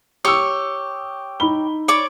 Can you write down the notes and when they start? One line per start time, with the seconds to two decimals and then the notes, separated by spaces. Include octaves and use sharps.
0.25 G4 C#5 C#6 D#6 E6
1.40 D#4 B5 G7
1.88 C#5 D5 D6